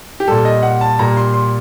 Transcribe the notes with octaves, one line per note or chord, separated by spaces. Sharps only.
G4
A#2 G3 A4
D#5
F#5
A5
A#2 G3 A#5
C6
C6